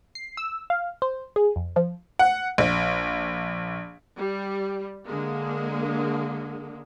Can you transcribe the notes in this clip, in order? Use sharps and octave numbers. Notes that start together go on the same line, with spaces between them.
C7
E6
F5
C5
G#4
F2
F3
F#5
A#1
G3
D3 G#3 A#3